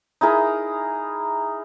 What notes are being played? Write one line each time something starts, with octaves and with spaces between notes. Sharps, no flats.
D#4 E4 G#4 A#4